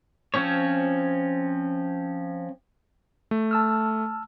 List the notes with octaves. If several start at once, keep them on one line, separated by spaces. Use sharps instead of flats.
F3 C4 C#4 C#5
A3
A5 E6 F6